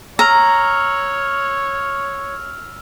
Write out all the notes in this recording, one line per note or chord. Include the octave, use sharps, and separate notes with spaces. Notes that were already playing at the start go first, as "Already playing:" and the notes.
C#5 A#5 E6 F6 F7